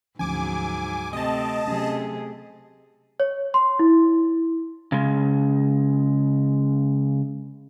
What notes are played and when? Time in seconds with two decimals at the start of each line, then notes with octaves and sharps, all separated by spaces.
0.19 D2 G#2 F3 F#3 C#4 G#5 D6
1.13 C3 A3 C4 D#5 A5
1.67 C3 F#3 A3 C#4 G#4
3.20 C#5
3.54 C6
3.79 E4
4.92 C#3 G#3